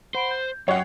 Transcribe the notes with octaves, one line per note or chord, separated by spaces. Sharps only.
C5 F#5 B5 D7
G6
F#2 C#5 F#5 G5 C7